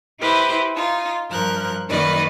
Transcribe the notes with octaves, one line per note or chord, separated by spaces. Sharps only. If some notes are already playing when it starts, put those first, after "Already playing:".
E4 G4 B4 C5 D#5
D#4 F4
G2 F3 A#4 F#6
F#2 D#3 A#3 B4 D5 D#5